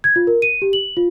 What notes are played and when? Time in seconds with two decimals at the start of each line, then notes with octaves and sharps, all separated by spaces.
0.04 G#6
0.16 F4
0.27 A#4
0.42 D#7
0.62 G4
0.73 F#7
0.97 F4